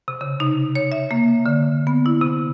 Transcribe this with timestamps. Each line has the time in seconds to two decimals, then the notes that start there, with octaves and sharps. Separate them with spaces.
0.08 C3
0.21 C#3
0.40 D#4
0.75 C#5
0.92 E5
1.11 A#3
1.46 D3
1.87 B3
2.06 E4
2.21 C3